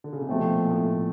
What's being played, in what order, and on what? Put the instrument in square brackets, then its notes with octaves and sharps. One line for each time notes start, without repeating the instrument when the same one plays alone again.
[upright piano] D3
C#3
C3
[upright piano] B2 [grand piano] F3 A3 C4
[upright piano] A#2
A2